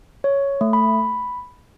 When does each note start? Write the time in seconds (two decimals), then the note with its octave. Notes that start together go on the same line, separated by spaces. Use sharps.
0.24 C#5
0.61 A3
0.73 B5